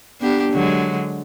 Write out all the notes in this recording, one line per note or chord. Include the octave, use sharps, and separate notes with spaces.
B3 D4 G4
D3 F#3 G#3